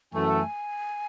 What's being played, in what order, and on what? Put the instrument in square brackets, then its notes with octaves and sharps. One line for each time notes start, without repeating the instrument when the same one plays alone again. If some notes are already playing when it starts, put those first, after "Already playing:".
[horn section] F#2 E3 A3 [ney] G#5
[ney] F#5
G#5